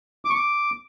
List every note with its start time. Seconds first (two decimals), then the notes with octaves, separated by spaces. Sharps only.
0.25 D6
0.30 C#6
0.35 D6